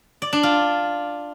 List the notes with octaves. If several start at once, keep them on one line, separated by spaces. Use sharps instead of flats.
D5
D4
F4